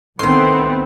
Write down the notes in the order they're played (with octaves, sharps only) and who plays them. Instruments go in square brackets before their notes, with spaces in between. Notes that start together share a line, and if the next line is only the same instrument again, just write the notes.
[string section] C2 B3 C4 [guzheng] A2 D#3 [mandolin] C6